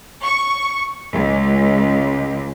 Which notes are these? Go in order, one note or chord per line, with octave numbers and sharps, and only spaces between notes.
C#6
C#2